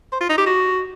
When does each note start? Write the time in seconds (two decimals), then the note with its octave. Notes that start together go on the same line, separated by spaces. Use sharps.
0.12 C5
0.21 F4
0.29 D#4
0.38 G4
0.46 F#4